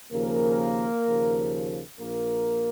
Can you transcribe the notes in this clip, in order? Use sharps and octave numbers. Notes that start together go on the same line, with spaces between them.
D#2 C#3 F3 A#3 A#4
D#2 C#3 F3
A#1 A#3 A#4